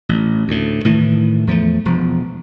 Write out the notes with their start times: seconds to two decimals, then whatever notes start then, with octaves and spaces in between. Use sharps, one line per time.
0.09 A1
0.48 D2 A2
0.85 A2 D#3 E3
1.47 E2 F3 G#3 A3
1.85 E1 F3